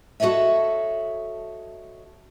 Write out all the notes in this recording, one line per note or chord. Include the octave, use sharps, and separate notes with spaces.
F#4 A4 C#5 D#5 E5